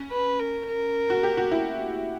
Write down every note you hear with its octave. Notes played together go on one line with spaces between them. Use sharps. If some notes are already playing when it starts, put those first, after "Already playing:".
Already playing: C#4
B4
A#4
A#4
F#4
G4
F#4
E4